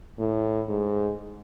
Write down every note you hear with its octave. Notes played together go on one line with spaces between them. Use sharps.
A2
G#2